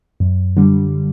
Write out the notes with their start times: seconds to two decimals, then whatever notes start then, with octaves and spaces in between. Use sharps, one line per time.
0.20 F#2
0.57 D3 G3